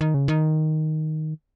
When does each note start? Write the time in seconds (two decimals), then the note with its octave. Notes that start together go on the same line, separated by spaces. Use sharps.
0.01 D#3
0.14 C#3
0.28 D#3